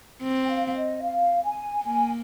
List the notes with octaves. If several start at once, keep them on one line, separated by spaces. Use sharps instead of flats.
C4
G5
F5
F5
D#5
F5
G#5
A#3 G#5